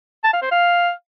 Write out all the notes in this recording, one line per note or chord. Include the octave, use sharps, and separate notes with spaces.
A5
F5
C5
F5